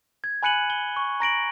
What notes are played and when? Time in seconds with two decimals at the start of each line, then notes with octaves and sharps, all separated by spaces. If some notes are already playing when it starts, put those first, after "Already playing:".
0.24 G#6
0.43 G#5 B5 F#6 C#7 D#7 F#7
0.70 G7
0.96 C#6
1.20 A#5 A#6 D7 F#7